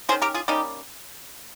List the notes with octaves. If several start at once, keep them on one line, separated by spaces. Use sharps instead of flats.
D#3 A#3 C#4 G#4 C5
G4 A#4
F4 G#4
D#3 G3 A#3 C#4 D#4 G4